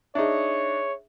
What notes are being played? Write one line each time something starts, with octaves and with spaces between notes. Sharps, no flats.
D4 D#4 G#4 C#5 E5